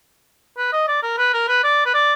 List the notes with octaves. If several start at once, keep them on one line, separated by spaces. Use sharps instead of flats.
B4
D#5
D5
A#4
B4
A#4
B4
D5
B4
D5